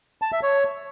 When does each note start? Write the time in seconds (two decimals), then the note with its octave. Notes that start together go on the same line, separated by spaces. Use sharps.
0.22 A5
0.32 E5
0.43 C#5